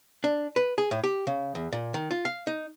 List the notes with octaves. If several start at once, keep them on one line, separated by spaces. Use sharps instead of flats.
D4
B4
G#4
A2
G4
C#3
E2
A#2
D#3
F4
F5
D#4